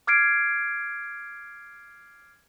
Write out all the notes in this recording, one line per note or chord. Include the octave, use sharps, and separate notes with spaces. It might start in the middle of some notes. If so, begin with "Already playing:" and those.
D6 F6 G#6 C7 D7